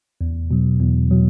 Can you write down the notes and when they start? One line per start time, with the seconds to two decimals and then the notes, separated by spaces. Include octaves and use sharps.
0.21 E2
0.51 B2 F#3
0.81 E2
1.11 B2 F#3